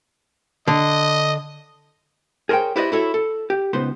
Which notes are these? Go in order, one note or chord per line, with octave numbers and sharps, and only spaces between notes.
D3 D#5
G#4 A#4 C5 C#5 G5
E4 G4 B4 C5 D5 D#5
E4 F#4 A4 C#5 E5
A4
G4
C#2 B3 D#4 B4 C5 C6